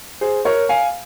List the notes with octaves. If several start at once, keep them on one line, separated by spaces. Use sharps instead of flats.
G#4 C5
A#4 C#5
F5 G#5